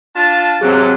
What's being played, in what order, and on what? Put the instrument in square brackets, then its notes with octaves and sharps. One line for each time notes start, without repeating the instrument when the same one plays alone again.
[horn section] D4 F4 A5
[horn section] G#2 C3 F#3 [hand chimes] C4 G#4